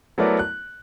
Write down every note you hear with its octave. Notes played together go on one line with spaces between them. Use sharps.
F#3 A3 B3 E4 A#4 D5
F#6